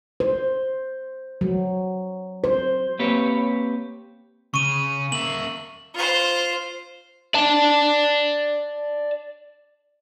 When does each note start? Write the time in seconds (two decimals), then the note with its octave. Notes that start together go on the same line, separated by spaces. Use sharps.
0.20 C5
1.41 F#3
2.44 C5
2.99 A#3 C4 G4 B4 C#5
4.54 C#3 C#6 D#7
5.12 A#3 E5 F#7
5.94 F4 C5
7.34 D5 A5